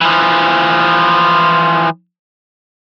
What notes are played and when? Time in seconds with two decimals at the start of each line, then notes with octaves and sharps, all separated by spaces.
0.01 E3 F3